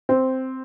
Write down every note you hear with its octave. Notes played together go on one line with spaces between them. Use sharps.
C4